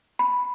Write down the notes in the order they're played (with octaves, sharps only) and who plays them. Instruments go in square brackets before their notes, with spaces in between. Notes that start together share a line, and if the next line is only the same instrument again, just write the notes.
[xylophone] B5